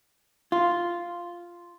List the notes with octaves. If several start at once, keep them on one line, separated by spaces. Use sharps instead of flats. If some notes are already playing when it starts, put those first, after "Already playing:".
F4